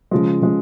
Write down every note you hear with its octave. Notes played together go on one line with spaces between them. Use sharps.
C#3 F3 G#3
C#3 F3 G#3